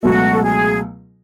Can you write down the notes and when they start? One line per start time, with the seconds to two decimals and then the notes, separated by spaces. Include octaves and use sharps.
0.03 C#2 B2 F#3 A3 F#4
0.32 A4
0.43 G#4